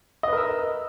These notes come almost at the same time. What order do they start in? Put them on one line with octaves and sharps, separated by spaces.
D#5 B4 A#4 E6